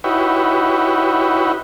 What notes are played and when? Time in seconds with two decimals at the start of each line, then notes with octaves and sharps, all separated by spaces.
0.04 D#4 E4 F#4 G4 B4 C#5